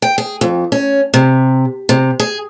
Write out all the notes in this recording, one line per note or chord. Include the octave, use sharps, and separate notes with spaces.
G5
G#4
F2
C#4
C3
C3
G#4